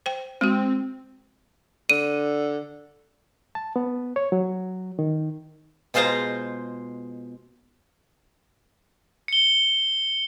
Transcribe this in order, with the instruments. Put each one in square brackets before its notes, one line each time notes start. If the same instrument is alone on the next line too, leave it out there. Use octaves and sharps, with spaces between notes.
[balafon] C5 G5
[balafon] G#3 F#4 [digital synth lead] C4
[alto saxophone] D3 [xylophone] D#7
[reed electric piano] A5
B3
C#5
F#3
D#3
[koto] B2 G#3 F4 C5 F5 A#5
[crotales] C#7 G7